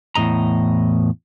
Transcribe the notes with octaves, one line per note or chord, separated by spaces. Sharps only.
E2 A2 C3 D#5 A#5